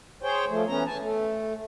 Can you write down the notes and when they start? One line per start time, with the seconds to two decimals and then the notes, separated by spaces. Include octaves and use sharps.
0.22 G#4 C5 C#5 G5
0.49 F3 A3
0.68 E3 B3 C#4 A#5
0.86 G#5 A5
1.00 A3